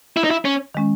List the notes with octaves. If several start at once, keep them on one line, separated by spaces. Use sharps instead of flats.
E4
D#4
E4
C#4
D#3 G#3 C#4